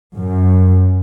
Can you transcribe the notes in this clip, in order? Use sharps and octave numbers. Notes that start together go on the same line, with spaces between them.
F#2